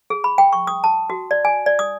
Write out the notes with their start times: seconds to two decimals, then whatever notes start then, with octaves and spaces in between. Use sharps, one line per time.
0.10 G#4
0.24 B5
0.38 G5
0.53 C#6
0.67 D#6
0.84 A5
1.10 F#4
1.31 D5
1.45 G#5
1.66 D5
1.79 D#6